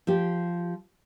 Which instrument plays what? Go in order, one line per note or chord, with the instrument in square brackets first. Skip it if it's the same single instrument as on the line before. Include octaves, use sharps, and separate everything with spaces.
[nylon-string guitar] F3 G4